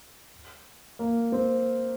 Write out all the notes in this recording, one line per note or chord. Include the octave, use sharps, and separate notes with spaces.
A#3
C4